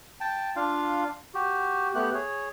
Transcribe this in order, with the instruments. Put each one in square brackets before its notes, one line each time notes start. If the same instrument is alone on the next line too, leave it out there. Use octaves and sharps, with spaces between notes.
[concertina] G5 A5
D4 F4 F5
F#4 G4
A3 B3 G4 F#6
G#4 C#5